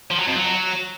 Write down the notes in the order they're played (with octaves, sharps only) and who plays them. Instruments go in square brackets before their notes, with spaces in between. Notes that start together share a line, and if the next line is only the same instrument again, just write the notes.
[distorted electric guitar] F3
F#3
F2
F#3